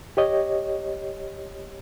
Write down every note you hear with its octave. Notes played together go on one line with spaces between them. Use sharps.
G4 C#5 D#5